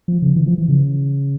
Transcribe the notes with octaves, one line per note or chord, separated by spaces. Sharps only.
F3
C#3
E3
F3
E3
C#3